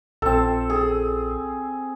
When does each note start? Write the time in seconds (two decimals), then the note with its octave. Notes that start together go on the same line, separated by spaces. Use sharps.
0.22 A#1 C4 A4 E6
0.70 G#4